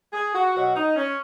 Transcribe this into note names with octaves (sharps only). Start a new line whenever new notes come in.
G#4
F#4
B2 F#3 F#4
D#4
C#4